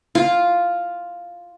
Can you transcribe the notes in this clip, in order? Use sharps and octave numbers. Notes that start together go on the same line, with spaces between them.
F4